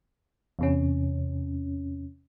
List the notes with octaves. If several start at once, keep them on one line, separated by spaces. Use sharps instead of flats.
E2 C3 C#4